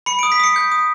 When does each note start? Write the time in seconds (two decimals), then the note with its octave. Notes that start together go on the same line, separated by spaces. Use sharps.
0.06 B5 C#7
0.19 D7
0.23 D#6
0.32 B6
0.40 D#6 C#7
0.56 G6
0.72 D#6